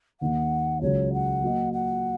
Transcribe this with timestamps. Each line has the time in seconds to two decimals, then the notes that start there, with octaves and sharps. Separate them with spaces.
0.20 D#2 D#3 A#3 F#5
0.81 C#2 C#3 F#3 C#5
1.13 F#5
1.42 F#3 A#3 F#4 D#5
1.73 F#5